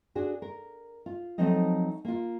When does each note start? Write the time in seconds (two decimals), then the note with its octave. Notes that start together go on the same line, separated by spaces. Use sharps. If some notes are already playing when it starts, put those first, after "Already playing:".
0.15 D4 F#4 G#4
0.42 A#4
1.06 F4
1.38 F3 F#3 A3 C4 D#4 D#5
2.05 A#3 F4